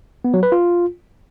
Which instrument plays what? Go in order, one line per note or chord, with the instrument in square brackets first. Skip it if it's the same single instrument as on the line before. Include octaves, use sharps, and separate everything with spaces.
[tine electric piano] B3
F#3
B4
F4